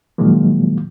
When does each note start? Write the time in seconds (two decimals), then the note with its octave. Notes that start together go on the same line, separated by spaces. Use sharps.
0.18 A#2 D#3 F3 F#3 G#3 A#3